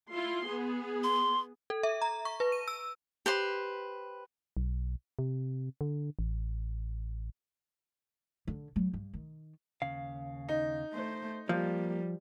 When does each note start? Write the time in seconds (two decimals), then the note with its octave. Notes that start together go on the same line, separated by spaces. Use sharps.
0.14 E4 F4 C6
0.47 B3 G#4
1.04 C6
1.70 A4
1.83 E5
2.02 A#5
2.25 C#6
2.40 B4
2.52 D#7
2.68 E6
3.26 G4 B4 C5
4.57 B1
5.19 C3
5.81 D3
6.19 A1
8.47 D3
8.76 F#3
8.93 G2
9.14 D#3
9.82 D#2 C#3 F5
10.49 D#4
10.93 A3 C5
11.49 F3 G3 A#3